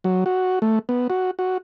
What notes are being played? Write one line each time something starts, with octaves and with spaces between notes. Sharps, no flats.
F#3
F#4
A3
B3
F#4
F#4